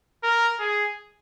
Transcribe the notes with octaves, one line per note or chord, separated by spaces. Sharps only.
A#4
G#4